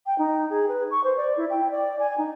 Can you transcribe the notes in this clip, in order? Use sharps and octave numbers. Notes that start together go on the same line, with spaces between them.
G5
D#4
G#4
B4
C#6
C5
D5
E4
G5
D5
G#5
D#4